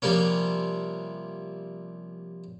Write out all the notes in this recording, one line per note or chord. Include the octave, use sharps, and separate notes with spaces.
C3 F3 G3 A#3 C#4